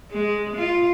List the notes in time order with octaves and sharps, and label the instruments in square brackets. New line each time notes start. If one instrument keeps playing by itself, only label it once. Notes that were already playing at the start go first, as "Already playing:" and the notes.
[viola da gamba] G#3
F4